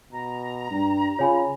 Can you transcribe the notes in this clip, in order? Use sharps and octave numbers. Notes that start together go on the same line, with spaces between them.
B2 A#5
G2 G3
C#3 F4 C#5 G#5 B5